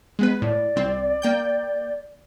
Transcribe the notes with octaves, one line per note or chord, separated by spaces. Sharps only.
G#3 B3 B4
A2 D5
C2 C4
A#3 G5 G6